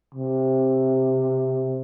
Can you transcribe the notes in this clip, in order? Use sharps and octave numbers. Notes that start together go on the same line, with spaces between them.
C3